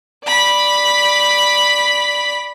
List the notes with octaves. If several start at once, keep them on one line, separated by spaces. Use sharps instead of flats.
D5 B5